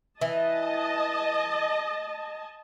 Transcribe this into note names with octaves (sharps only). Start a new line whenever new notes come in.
E3 D#5 A5